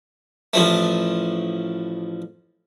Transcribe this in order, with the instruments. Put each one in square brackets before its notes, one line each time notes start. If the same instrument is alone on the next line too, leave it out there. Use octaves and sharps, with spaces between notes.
[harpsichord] A1 F3 A3